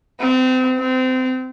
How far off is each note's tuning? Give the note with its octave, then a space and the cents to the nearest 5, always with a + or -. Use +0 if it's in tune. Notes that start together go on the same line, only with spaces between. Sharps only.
C4 -30
C4 -25